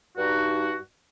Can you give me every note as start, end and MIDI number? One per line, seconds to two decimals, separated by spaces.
0.17 0.76 43
0.17 0.76 63
0.17 0.76 66